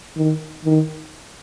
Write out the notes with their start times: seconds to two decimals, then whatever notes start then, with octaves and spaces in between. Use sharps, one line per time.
0.16 D#3
0.64 D#3